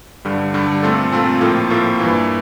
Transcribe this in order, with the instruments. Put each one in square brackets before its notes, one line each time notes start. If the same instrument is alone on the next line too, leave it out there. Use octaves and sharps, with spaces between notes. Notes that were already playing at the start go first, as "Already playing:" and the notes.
[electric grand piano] G2 D3 G3
G2 D3 G3
A#2 A3 C4 F4 A4
A#2 A3 C4 F4 A4
A2 F3 A#3 F4 A4
A2 F3 A#3 F4 A4
G2 E3 A#3